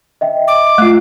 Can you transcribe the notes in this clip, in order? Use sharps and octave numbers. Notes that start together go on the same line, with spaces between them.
D#5 E5 G5
D6
A3 F4 E6 C7